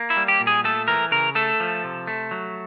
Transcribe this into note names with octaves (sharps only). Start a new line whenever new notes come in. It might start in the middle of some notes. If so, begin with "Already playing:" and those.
Already playing: A#3
E4
G3
G4
A#2
G#4
A3 A4
E3 A#4
C#3 A#4
A3 A4
F3
C3
A3
F#3